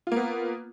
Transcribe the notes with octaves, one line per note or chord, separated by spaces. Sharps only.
A#3 B3 F4